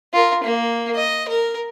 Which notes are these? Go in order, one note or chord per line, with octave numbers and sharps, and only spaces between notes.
F4 A#4
A#3
D#5
A#4